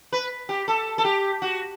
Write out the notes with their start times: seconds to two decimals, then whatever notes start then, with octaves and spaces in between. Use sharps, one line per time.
0.13 B4
0.49 G4
0.68 A4
0.98 A4
1.05 G4
1.42 F#4